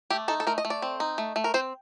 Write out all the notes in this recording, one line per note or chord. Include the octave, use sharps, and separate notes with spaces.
A3 G4
D#4 A4
A4
A3 A#4
D#5
A3
D5
C4
D#4
A3
A3
A#4
C4 C5